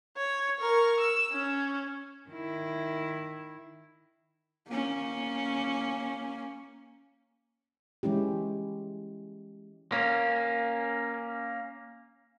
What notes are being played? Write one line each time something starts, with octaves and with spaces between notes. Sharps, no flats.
C#5
A#4 C#6
E6
C#4
D#3 E4
A#3 C#4
E3 G#3 C#4 E4 G4
A#3 C#4